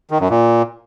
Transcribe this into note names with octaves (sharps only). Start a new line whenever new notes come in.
D#3
F#2
A#2